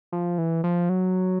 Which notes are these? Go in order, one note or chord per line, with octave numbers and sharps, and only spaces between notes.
F3
E3
F3
F#3